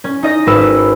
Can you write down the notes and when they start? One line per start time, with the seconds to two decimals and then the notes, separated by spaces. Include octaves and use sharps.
0.04 C#4
0.23 D#4 D#5 A#6
0.46 G#1 B4 E6
0.61 E6